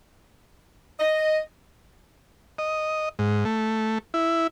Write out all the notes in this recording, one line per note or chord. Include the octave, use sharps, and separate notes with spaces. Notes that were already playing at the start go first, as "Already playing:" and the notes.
D#5
D#5
G#2
A3
E4